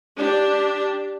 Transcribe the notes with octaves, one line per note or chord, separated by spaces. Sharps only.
D4 G4